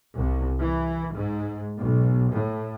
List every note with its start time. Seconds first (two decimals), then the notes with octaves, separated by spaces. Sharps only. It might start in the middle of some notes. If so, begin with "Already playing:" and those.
0.15 C2
0.60 E3
1.15 G#2
1.79 B1
2.34 A2